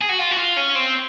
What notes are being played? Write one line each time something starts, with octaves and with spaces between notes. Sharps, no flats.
G#4
F#4
F4
F#4
F4
C#4
C4